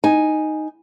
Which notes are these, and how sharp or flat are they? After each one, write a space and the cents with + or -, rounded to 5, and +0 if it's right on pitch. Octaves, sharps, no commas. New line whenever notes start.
D#4 +0 G#5 +0